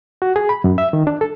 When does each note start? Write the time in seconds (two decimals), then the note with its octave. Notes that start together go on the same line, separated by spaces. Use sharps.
0.22 F#4
0.36 G#4
0.49 B5
0.64 F#2
0.78 E5
0.93 D#3
1.07 D4
1.21 A4